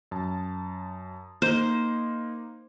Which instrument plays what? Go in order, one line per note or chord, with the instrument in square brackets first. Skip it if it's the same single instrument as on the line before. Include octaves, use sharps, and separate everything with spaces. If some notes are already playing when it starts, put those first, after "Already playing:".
[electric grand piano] F#2 A5
[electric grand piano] A#3 D#4 [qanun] C5